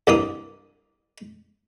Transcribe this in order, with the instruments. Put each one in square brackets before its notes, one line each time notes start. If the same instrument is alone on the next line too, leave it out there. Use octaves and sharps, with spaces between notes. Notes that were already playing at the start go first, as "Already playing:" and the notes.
[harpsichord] C2 G2 A#3 D#6